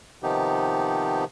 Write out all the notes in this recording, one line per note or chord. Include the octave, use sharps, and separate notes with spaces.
C3 D#3 F3 B3 D#4 G4